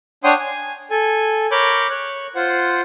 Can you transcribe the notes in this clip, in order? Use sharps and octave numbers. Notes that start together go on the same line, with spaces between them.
D4 C#5 F#5 G5 C6 D#6
G#5
A4 G#5
A#4 C#5 B5 D6 G6
C#5 F#6
F4 C5 F#5